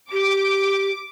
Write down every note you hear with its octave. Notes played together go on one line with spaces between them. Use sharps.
G4 D6